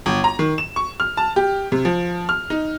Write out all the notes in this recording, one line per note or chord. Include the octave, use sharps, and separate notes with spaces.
G1
A#5
D#3
E7
C#6
F6
A5
G4
C3
F3
F6
D#4